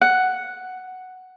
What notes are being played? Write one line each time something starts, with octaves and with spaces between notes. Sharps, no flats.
F#5